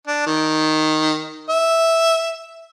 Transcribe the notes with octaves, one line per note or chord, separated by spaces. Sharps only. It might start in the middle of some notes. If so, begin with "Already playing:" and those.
D4
D#3
E5